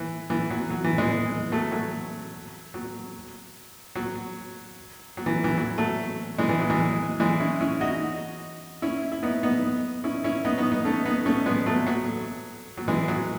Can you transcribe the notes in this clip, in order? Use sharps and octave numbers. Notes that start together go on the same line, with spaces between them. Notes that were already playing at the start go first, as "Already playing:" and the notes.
Already playing: E3
E3
F#3
F#3
E3
E3 G#3
F#3 A3
F#3 A3
F#3
F#3
F#3
E3
E3
F#3
F#3 A3
E3 G#3
E3
F#3
E3 G#3
E3 G#3
C#4 E4
C#4 E4
D#4 F#4
C#4 E4
E4
B3 D#4
B3 D#4
C#4 E4
C#4 E4
B3 D#4
B3 D#4
B3 D#4
A3 C#4
B3 D#4
A3 C#4
G#3 B3
F#3 A3
F#3
F#3
E3 G#3
F#3